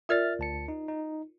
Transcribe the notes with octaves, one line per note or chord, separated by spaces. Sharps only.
F4 A#4 D5 E5 F6 A6
D2 A5 C#7
D#4
D#4